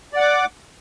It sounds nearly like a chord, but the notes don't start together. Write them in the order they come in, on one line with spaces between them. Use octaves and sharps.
D5 F#5 D6